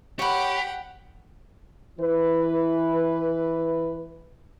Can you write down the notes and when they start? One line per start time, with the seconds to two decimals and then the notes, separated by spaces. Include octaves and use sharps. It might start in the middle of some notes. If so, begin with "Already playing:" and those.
0.19 G4 C#5 F#5 G5 B5
1.99 E3 B4